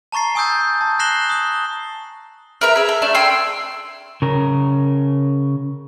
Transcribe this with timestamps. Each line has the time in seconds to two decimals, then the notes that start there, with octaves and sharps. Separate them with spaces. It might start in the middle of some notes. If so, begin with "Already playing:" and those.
0.12 A5 A#5 C#6 A6 C7
0.35 G#5 C#6 D#6 E6 G6 A6
0.81 A5
0.99 F#6 A#6 C7 E7 F#7 G7
1.30 D#6 G7
2.61 A#4 B4 E5 A#5
2.76 G#4 E5
2.89 A4
3.02 A3 D4 E5 F6
3.15 G5 G#5 C6 E6
4.22 C#3 A#4